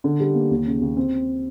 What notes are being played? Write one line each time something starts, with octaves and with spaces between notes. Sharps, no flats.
D3
G3
A#3
D#2
C#3
D#2
C4